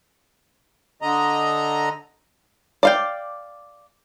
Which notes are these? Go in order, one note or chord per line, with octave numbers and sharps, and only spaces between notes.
D3 D#5 A#5
D5 F5 G5